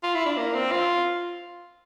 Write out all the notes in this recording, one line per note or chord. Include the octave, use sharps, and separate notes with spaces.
F4
E4
D4
A#3
C4
F4